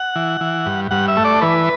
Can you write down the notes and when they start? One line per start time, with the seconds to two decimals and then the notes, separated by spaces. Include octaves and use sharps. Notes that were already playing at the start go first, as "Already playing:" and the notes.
Already playing: F#5
0.16 E3
0.41 E3
0.66 G2
0.91 G2 F#5
1.08 E5
1.17 A3
1.25 D5
1.41 E3 B4